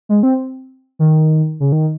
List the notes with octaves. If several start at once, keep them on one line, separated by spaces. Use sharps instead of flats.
G#3
C4
D#3
C#3
D#3